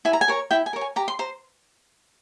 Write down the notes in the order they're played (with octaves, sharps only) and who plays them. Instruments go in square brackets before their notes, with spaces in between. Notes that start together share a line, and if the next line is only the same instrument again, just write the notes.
[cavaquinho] E4 G#5
A#5
G#5
A#4 C#5
E4 G5
G#5
A#4 C#5
G#5
G4 A#5
C6
C5 A#5